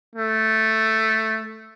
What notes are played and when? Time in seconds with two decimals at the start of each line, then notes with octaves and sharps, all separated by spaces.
0.16 A3